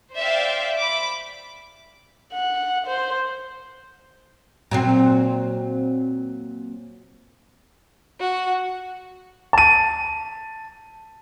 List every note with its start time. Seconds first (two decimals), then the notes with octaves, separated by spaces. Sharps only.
0.17 C5 D5 E5 F5 G5
0.80 B5 D6
2.33 F#5
2.87 C5
4.71 A#2 F#3 C4
8.20 F#4
9.53 A5 D#7